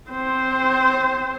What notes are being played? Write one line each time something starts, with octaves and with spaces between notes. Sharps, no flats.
C4 C5